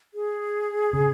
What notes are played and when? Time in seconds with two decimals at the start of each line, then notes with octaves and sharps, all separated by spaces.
0.14 G#4
0.93 C#3